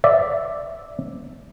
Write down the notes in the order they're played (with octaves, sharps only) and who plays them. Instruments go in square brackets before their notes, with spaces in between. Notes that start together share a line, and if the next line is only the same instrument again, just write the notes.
[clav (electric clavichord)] D5 E5